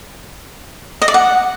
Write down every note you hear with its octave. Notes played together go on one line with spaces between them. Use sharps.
D#5
D5
F#5